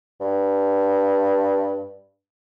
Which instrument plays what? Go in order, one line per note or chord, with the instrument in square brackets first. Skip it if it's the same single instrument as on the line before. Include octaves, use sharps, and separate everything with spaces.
[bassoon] G2